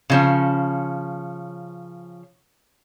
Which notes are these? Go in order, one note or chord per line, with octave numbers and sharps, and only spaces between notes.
C#3 F3 C#4